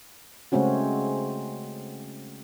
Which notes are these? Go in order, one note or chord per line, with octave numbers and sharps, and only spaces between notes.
C#3 G#3 A3 C4 C#4 F#4